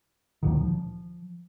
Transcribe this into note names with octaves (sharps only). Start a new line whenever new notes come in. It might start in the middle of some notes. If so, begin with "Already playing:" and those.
D2 A#2 D#3
F3